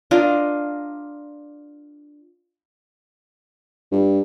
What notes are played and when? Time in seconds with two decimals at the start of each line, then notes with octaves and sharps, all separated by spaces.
0.11 D4 F4 A#4 D#5
3.92 G2